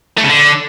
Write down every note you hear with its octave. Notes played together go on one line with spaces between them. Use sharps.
A3
C#3
D3